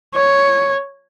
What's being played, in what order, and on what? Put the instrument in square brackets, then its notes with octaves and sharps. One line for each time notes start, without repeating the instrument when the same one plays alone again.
[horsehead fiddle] C#5